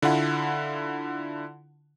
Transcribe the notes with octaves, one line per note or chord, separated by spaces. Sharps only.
D3 E4 F4 F#5